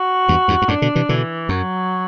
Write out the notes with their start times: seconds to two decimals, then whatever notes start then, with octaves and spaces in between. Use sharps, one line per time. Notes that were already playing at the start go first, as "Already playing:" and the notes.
Already playing: F#4
0.28 E2 G2
0.48 E2 G2
0.62 G2
0.68 F#2 A2 D4
0.82 B2 D3
0.95 C3 E3
1.09 B2 D3 E3
1.49 F#2 F#3